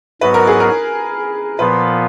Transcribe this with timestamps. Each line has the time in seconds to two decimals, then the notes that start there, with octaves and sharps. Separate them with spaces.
0.21 G#2 F#3 B3 F#4 B4
0.34 A#4
0.47 G#4
0.60 A#4
1.59 A#2 F3 B3 F4 B4